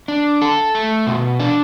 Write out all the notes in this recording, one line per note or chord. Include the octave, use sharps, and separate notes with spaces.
D4
A4
A3
B2
D4